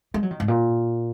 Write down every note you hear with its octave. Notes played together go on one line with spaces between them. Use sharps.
G#3
F#3
D#3
G#2
A#2